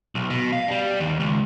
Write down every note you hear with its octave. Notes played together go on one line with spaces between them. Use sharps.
B1
B2
F5
G3
D#2
C#2